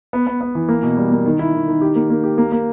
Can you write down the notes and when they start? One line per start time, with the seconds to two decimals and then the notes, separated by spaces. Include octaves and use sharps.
0.13 B3
0.27 B3
0.41 B3
0.55 E3
0.69 A#3
0.83 B2
0.97 G3
1.11 A#3
1.25 D#3
1.39 E4
1.54 D#3
1.68 D#3
1.81 G4
1.96 A#3
2.10 A#3
2.24 G4
2.38 A#3
2.52 A#3